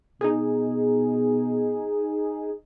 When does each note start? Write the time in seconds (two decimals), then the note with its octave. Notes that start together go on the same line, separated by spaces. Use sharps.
0.21 B2 D#4 G#4